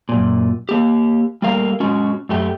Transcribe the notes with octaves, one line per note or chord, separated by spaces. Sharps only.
F#2 A#2
A#3 G4
G3 A3 A#3 A#4 F5
G#3 C#4 F#4
F#2 A3 G4